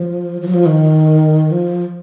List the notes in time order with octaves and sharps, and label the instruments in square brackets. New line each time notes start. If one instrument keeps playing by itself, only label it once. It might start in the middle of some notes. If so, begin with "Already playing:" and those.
Already playing: [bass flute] F3
F3
F#3
F3
D#3
F3